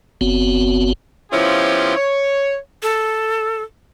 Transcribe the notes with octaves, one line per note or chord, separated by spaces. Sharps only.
F#1 B3 C4 F#4
F3 B3 C#4 E4 F4 G4
C#5
A4